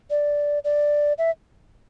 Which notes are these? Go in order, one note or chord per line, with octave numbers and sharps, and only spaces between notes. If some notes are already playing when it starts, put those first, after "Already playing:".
D5
D5
E5